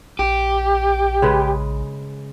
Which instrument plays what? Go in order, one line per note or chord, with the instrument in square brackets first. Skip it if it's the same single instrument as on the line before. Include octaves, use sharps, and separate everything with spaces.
[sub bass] A#1 [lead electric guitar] G4
[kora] C#3 G#3 B4